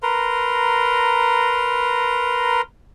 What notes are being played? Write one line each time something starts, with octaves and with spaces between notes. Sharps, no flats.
A#4 B4 A#5 C6